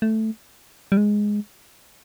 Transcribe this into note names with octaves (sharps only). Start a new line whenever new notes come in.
A3
G3
G#3